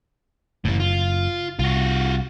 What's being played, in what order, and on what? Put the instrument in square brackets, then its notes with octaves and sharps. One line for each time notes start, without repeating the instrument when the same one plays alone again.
[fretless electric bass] F#1 [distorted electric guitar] A2 E3
[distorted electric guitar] F4
[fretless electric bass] C2 [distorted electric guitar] F4 F#4